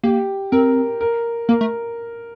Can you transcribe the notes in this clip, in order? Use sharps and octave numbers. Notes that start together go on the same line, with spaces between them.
A#3 G4
C4 A#4
A#4
A#3 A#4
A3